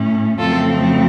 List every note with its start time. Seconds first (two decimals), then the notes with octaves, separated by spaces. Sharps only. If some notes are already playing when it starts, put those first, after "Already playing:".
Already playing: A2 A3 C#4
0.39 F2 C#3 F#3 A3 C4 F4 A4